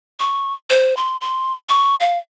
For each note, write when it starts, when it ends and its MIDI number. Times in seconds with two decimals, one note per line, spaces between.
0.20 0.53 85
0.70 0.96 72
0.97 1.17 84
1.21 1.53 84
1.69 1.95 85
2.00 2.18 77